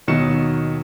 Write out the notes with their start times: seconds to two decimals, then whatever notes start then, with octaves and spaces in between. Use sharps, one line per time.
0.08 D#2 B2 F#3 D#4 C#7 E7